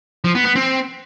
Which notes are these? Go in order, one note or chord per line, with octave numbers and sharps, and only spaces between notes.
F3
B3
B3
C4